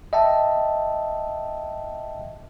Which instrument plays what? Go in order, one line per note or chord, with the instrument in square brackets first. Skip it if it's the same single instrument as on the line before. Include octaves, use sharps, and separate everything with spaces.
[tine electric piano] D#5 E5 G5 A5